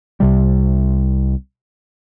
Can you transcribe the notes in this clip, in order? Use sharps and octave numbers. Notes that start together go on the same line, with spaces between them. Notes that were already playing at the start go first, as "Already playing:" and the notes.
C2 C3 G3